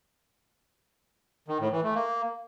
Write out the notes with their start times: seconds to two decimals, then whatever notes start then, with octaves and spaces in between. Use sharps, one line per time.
1.48 D#3
1.60 A2
1.72 E3
1.83 A3
1.95 A#3